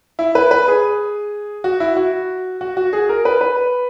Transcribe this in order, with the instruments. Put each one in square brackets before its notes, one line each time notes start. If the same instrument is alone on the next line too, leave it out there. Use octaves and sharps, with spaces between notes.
[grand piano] E4
B4
B4
G#4
F#4
E4
F#4
F#4
F#4
G#4
A#4
B4
B4